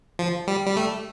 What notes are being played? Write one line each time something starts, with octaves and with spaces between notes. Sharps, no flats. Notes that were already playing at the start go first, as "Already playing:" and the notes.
F3
G3
G3
A3